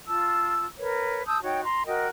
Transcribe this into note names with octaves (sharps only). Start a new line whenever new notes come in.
F4 A5 E6
A#4 B4 C#5
A5 D#6 E6 G6
D#4 F#4 C#5 G5
A#5 C6
F#4 A#4 D#5 G5